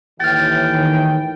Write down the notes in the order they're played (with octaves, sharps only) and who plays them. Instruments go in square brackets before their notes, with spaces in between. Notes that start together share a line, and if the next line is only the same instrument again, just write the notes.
[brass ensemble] D#2 A2 E3 [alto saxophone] G5 [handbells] F6 A6
[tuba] D#3